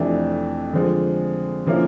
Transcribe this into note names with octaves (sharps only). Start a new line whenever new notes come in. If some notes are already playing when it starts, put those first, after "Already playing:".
Already playing: F2 C3 E3 A3 D4
D3 F3 G#3
D3 F3 A#3 C#4 E4